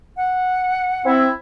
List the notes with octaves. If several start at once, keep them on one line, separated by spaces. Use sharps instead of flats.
F#5
C4 E4